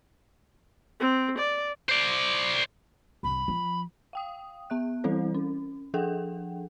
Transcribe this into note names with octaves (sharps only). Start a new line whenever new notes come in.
C4
D5
C5 D5
C2 G2 B5
F3
F5 G5 D#6
B3 E5 F#6
E3 G3 C4 E4 A4 C5
C#4
F3 D4 G#4 A4 F#5 G5